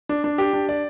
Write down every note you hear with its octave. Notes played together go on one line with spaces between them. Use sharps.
D4
D4
G4
D4
D5